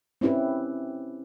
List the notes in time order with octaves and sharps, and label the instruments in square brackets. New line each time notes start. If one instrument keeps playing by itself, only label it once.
[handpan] C4 C#4 E4 G4 B4